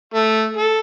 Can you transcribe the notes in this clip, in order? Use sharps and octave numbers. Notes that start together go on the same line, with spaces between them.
A3
A4